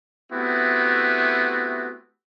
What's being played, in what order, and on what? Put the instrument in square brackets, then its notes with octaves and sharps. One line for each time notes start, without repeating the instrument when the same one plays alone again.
[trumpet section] A3 B3 C4 E4 F#4 G4